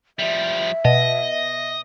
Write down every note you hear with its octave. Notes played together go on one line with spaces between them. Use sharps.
F3 G3 E5
B2 D#5